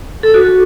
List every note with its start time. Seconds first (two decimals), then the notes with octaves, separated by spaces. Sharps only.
0.23 A4
0.34 F#4